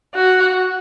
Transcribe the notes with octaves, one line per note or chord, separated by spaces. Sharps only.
F#4